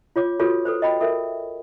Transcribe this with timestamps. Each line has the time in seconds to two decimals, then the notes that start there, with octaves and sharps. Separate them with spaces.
0.16 F4 C#5 D6
0.40 F4 F#4 G#4 A4 B4 C#5
0.65 A4 B4 C5
0.82 D#5 G5 B5
1.00 A4 A#4 E5